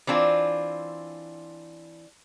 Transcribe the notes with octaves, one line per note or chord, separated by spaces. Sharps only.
E3 C4 D4 F4